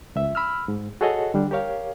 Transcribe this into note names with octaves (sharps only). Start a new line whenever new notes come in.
C#2 E5
B5 E6 F6
G#2
F#4 G#4 A4 C#5 D#5 F#5
D3 G3 D4
G4 A#4 C#5 F5